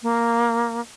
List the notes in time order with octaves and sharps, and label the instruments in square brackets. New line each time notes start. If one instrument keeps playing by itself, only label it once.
[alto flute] A#3